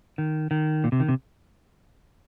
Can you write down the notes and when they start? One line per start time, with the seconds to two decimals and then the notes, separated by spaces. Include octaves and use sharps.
0.18 D#3
0.51 D#3
0.84 A#2
0.92 C3
1.00 D#3
1.08 C3